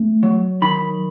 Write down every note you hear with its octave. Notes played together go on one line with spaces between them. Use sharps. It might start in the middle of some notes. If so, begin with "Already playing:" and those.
Already playing: A3
F#3
D#3 B5